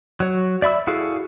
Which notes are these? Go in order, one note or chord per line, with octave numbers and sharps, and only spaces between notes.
F#3 C#5
D5 E5 B5 E6
E4 F#4 G#4 A4 F5